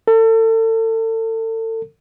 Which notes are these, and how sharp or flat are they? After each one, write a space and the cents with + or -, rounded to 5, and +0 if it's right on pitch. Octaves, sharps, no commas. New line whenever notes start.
A4 +35